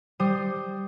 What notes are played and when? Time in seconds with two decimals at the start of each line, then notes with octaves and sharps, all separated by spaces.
0.20 G3 C5 D#6